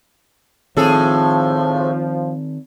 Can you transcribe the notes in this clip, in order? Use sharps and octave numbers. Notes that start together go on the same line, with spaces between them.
A2 D#3 F3 C4 G#4 A4